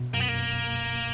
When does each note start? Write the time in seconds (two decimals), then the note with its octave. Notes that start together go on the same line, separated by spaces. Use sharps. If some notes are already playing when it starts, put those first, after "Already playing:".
Already playing: B2
0.14 F#2 A#3
0.20 B3
0.28 A#3